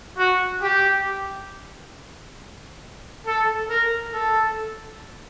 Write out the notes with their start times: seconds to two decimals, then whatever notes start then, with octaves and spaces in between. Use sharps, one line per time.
0.18 F#4
0.62 G4
3.26 A4
3.70 A#4
4.13 A4